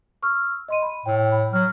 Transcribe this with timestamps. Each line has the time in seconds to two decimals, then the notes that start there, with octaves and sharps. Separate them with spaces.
0.22 C#6 E6 F6
0.68 D#5 C6 D#7
0.82 B5
1.06 A2 G5 E6
1.32 B5
1.53 F#3 F6